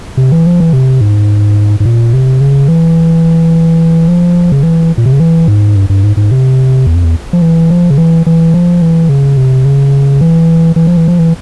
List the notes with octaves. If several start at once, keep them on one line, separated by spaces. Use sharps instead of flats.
C3
E3
F3
E3
C3
G#2
G#2
A#2
C3
C#3
E3
F3
C#3
E3
A#2
C3
C#3
E3
G#2
G2
G2
G#2
G#2
C3
E2
F2
E2
F3
E3
F3
C#3
E3
E3
F3
E3
C#3
C3
C#3
E3
E3
F3
E3
F3
E3